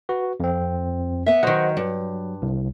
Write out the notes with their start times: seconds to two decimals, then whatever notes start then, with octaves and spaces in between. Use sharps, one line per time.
0.09 F#4 B4
0.40 F2 C4
1.26 B3 E5
1.43 D#3 F#3 C5 D#5 F#5
1.77 G2 F#3
2.42 C2